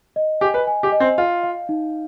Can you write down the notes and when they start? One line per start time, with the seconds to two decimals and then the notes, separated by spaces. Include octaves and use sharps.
0.16 D#5
0.41 G4 G#5
0.54 B4
0.67 G#5
0.83 G4
0.92 D#5
1.00 C4
1.18 F4 F5
1.43 F5
1.69 D#4